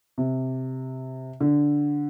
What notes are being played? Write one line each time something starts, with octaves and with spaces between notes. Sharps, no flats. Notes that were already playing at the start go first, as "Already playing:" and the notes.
C3
D3